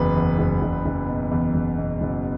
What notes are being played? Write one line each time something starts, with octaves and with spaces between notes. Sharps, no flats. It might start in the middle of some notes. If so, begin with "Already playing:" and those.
Already playing: F#1 E2 B4
E2
F#1
F#1
F#1
B2
E2
F#1
B2
F#1